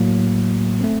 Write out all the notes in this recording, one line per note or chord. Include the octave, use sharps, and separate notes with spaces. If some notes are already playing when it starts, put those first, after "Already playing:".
Already playing: A2 F#3 A#3
A3 C4